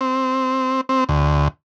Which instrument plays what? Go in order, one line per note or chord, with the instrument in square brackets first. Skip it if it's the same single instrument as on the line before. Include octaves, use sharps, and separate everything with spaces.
[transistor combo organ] C4
C4
D2